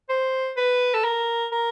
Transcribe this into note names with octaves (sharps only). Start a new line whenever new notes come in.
C5
B4
A4
A#4
A#4